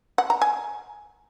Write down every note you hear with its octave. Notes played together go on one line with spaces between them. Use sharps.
F#5
A#5
G#5